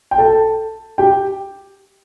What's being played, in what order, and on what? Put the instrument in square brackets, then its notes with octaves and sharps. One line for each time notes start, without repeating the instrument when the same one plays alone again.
[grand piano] G5
A4 A5
G4 G5